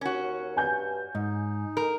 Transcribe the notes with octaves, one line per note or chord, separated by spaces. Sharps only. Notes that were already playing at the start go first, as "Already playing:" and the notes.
D#2 C#4 F#4
G2 G#5 G6
G#2 D#4
A#4